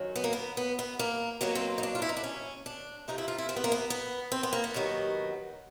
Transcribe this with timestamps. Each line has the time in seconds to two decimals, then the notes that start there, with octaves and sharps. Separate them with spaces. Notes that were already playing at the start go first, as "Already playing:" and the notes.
Already playing: F#2 D#3 F#3
0.16 B3
0.24 A#3
0.33 B3
0.57 B3
0.79 B3
0.99 A#3
1.41 B2 F#3 A#3 B3
1.55 C4
1.78 D#4
1.83 D4
1.95 F4
2.02 E4
2.09 D#4
2.17 D4
2.24 C#4
2.66 D4
3.08 F2 C3 F3 D#4
3.18 E4
3.28 F4
3.38 E4
3.49 C4
3.56 B3
3.64 A#3
3.72 B3
3.90 B3
4.32 C4
4.43 B3
4.53 A#3
4.64 B3
4.74 D#2 D#3 F#3